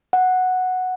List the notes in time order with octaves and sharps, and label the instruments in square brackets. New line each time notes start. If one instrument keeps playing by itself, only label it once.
[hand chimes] F#5